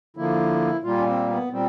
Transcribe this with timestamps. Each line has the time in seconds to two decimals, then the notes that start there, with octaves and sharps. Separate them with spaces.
0.16 D3 F3 A#3 E4
0.83 A#2 G3 A#3 F4
0.98 C#4
1.06 C4
1.29 B3
1.51 A#2 G3 C4